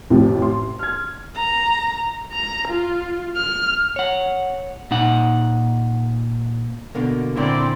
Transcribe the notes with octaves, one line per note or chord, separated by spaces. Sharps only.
A1 F2 A2 C3 F3
C6
F6 G#6
A#5
A#5
F4
F6
C#5 F#5
A#2 D#4 F#5
B2 D3 A#3
A#2 D3 C4 E4 D5